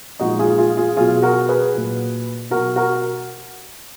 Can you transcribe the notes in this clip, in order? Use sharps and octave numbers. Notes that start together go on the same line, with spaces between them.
A#2 F3 G#3 D#4 F#4
F4 G#4
F4 G#4
F4 G#4
B2 F#3 F4 G#4
G#4
F#4 A#4
G#4 B4
A#2 F#3
B2 F#3 F#4 A#4
F#4 A#4